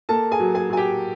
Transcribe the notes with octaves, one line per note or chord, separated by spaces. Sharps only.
A#3 A4 A5
G#4 G#5
F#3
G#4 G#5
F#3 G#5
G4 G5